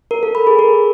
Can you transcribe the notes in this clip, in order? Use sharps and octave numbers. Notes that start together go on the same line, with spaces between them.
A#4
A4
B5
G#4
A#4